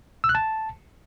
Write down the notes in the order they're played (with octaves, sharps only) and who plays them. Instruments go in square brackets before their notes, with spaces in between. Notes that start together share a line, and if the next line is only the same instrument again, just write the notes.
[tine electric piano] E6
F#6
A5